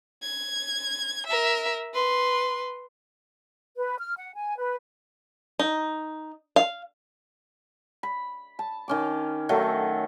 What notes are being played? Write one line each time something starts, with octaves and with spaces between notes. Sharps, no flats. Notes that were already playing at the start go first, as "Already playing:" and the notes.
G#6
A#4 E5
B4 C6
B4
F6
F#5
G#5
B4
D#4
F5
B5
A5
D#3 C#4 D6
D#3 F#3 A3 A4